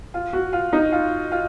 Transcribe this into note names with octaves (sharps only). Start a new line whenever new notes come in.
F4
F#4
F4
D#4
F4
F4